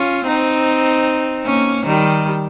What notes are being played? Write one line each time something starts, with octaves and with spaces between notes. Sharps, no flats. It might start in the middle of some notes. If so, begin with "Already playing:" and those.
Already playing: C#4 F4
C4 D#4
A#3 C#4
D#3 G3